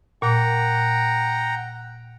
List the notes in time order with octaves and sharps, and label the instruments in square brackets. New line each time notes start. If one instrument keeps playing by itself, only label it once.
[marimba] A#2 [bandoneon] F#5 G5 A#5